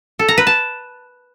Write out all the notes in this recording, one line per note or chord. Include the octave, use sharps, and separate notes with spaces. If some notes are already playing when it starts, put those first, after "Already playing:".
A4
A#5
B4
A5